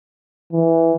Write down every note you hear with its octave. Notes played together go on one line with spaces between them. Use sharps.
E3